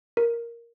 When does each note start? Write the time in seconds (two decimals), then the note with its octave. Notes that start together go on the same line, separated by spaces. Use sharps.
0.17 A#4